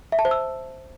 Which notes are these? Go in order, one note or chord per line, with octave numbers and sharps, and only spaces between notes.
E5
A5
C5
E6